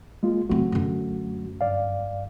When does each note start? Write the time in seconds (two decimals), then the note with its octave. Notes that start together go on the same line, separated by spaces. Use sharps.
0.23 G#3 A#3 F4
0.49 C#3 F#3 A3 C4 F#4
0.72 F#2 D3
1.61 G2 D5 F5